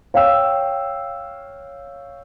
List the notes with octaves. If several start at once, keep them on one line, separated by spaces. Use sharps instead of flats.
C#5 F5 G5 E6